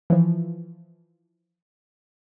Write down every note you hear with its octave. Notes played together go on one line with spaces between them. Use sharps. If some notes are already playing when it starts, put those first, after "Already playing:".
E3 F3